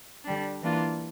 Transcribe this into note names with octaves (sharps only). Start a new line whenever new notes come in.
D3 G3 D4
E3 A#3 D4 F4